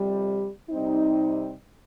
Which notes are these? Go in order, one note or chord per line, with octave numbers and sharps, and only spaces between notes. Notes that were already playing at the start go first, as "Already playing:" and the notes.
Already playing: F2 C3 G3
C3 G3 C4 D#4